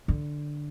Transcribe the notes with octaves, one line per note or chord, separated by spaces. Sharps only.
D3